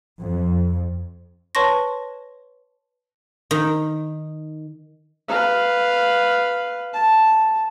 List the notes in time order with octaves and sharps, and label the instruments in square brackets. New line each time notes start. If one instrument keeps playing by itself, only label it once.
[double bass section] F2
[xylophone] B4 C#5 A5 C6 C#6 A#6
[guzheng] D#3
[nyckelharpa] B4 F5
A5